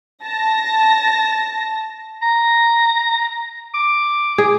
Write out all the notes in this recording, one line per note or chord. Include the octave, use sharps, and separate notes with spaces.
A5 A#6
A#5
D6
G#4